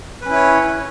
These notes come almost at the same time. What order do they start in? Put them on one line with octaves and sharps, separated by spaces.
B4 C#4 E4 C#5